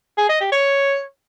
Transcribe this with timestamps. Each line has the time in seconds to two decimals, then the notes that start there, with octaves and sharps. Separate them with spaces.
0.18 G#4
0.29 D#5
0.41 G4
0.52 C#5